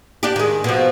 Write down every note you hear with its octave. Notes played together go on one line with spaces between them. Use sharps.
D4 G4
D#3 G#3
B2 F3